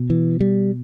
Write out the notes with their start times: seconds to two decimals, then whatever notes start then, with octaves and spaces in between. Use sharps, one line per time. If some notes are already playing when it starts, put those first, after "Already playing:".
Already playing: B2
0.10 E3
0.41 G3